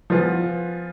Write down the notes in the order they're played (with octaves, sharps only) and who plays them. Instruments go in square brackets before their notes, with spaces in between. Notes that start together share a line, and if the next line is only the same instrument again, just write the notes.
[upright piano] F3 B3 F4 G#4